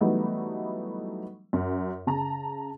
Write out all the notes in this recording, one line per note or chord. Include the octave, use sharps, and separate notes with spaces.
E3 F#3 G3 A3 B3 D#4
F#2
C#3 A5 A#5